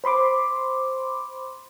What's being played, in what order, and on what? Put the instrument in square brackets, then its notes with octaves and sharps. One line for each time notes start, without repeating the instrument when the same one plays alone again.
[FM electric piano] C5 B5 C6 D6